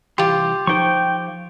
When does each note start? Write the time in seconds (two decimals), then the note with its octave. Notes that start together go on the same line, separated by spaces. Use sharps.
0.18 C2 E3 F4 G4 C6
0.67 F3 D#4 C5 G5 C#6